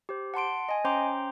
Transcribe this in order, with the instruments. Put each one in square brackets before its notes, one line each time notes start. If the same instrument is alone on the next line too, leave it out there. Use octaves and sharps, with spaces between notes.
[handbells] G4 C5
F#5 A5 C6 D7
D#5 G#5
C#4 C5 G5 A#5 C6 D6